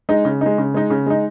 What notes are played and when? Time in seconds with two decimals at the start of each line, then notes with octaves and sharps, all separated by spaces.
0.09 G#3 D#4
0.25 C#3
0.41 G#3 D#4
0.58 C#3
0.74 G#3 D#4
0.90 C#3
1.06 G#3 D#4